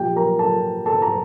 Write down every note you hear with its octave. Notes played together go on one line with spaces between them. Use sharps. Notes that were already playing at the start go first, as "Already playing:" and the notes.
Already playing: A#2 F3 G4 G5
A#4 A#5
A4 A5
A4 A5
A#5